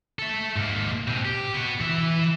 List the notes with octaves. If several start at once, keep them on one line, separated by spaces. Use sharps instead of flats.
A4 E5
G#2 A#3
B2 C4
G4
B3 F#4
E3 E5